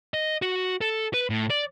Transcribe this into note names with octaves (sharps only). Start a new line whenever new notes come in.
D#5
F#4
A4
B4
A2
D5